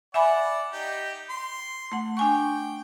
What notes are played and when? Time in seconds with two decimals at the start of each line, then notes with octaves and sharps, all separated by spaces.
0.14 D5 E5 F#5 G#5 B5
0.73 D#4 G4
1.30 C6
1.92 A3 F#5
2.17 D4 G5 G#5 C#6